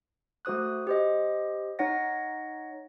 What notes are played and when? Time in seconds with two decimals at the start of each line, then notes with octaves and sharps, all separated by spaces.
0.45 A3 F#4 C5 D#6 F#6
0.87 G4 C5 D#5
1.79 D#4 C#5 F#5 A#6